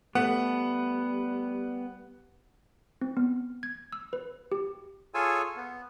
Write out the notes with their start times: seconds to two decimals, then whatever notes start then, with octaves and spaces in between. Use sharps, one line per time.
0.15 G3 A3 B3 F#5
3.01 C4
3.17 B3
3.63 G#6
3.93 E6
4.13 B4
4.52 G4
5.14 F4 G#4 A4 C#5 G#5 E6
5.56 B3